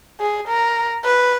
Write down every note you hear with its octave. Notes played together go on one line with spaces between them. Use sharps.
G#4
A#4
B4